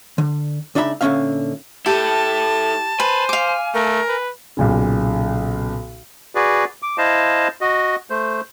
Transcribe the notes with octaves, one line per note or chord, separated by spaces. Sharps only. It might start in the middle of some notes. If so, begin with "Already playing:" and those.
D3
C#2 D4 D#4 E5 B5
A#2 D3 B3 C#4 E5 F5
E4 G4 A4 A5
B4 C5 G#5
F5 D6
A3 A#4
B4
B1 A#2 C#3
F#4 G#4 B4 D5
D6
E4 C5 D#5 F5 A5
F#4 D#5
A3 C5